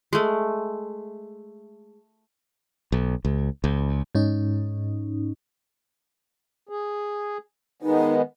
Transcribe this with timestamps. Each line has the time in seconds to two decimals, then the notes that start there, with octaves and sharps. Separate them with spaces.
0.13 G#3 A3
2.92 B1
3.25 C#2
3.64 C#2
4.15 G#2 C#4 D#4
6.69 G#4
7.82 D#3 G#3 B3 D#4